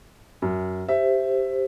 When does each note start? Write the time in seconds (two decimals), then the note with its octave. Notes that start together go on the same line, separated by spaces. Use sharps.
0.42 F#2
0.89 G4 C5 E5